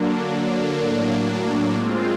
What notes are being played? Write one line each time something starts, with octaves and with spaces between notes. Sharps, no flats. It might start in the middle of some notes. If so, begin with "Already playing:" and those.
Already playing: D3 F#3 A#3 D4
A2 F#3 A#3 D4
G#3 C4 F4